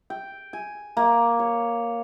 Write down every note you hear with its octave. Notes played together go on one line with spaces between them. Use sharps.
G5
G#5
A#3
C#5